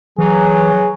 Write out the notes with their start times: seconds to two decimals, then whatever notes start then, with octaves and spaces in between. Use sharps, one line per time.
0.18 E3 F#3 G#4